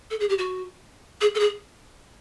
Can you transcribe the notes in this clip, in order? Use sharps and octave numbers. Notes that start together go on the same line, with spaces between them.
A4
G#4
G4
F#4
G#4
A4
G#4